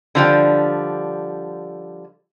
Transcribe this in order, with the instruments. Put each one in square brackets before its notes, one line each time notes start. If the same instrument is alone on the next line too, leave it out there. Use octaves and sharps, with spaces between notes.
[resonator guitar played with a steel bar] D3 F3 G3